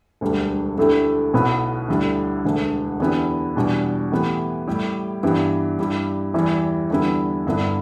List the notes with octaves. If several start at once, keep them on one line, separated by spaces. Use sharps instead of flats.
E1 D2 D3 G3
D2 D3 A3 E4 G4
B1 B2 B3 E4
D2 D3 G3 E4
E1 D2 D3
E2 D3 B3 E4 G4
E2 B2 G3 D4
A2 E3 B3 G4
A2 G3 E4 G4
G2 E3 G3 B3 G4
G2 G3 E4 G4
E2 E3 G3 E4 G4
E2 D3 G3 B3 E4
G1 G2 D3 B3 E4